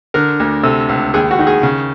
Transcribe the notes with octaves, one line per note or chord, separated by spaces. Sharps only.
D3 A#4
D2
C3 A4
C#2
D#2 G#4
F#4
D#3
G#4
C#3